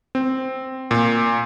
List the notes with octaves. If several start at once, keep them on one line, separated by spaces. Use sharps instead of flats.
C4
A#2